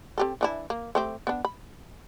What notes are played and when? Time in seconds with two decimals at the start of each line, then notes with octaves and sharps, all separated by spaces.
0.18 C4 G4 A4
0.41 E3 D4 E4
0.70 A#3
0.95 A3 C4 G4
1.27 B3 D4
1.45 B5